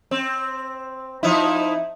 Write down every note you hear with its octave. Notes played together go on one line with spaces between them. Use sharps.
C4
F3 D#4 E4